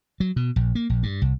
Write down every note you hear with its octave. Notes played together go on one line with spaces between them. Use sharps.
F#3
B2
A#1
A#3
A#1
G2
C2